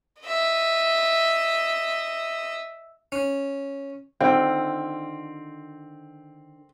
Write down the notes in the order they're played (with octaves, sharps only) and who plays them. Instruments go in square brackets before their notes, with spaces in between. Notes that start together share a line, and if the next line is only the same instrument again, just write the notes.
[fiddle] D#5 E5
[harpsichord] C#4
[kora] D3 D#3 F4 [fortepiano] C4